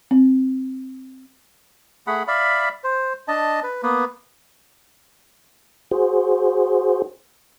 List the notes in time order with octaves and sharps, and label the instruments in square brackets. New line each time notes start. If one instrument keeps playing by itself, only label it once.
[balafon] C4
[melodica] A3 G#4 F#5 B5
D5 E5 F5 B5
C5
D4 D#5 A5
B4
A#3 B3 B4
[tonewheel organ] F#4 G#4 C5